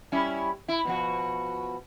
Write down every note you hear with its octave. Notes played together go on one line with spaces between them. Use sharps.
G3 C#4 E4
E4
B2 F3 F#4